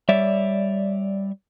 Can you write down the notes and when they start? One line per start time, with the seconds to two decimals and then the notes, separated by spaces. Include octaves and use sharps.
0.09 G3 C#5 D5 E5